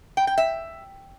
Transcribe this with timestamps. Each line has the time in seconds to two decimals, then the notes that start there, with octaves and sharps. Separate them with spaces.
0.17 G5
0.27 G5
0.38 E5